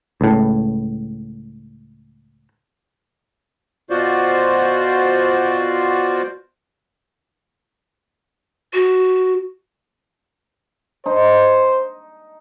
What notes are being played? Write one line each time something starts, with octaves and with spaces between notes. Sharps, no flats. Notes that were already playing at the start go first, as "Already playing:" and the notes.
C#2 A2
B2 F4 F#4 C5 D5
F#4
D#4 C5